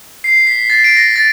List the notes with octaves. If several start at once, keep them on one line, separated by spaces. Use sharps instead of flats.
C7
B6
A6
D7
A#6
A6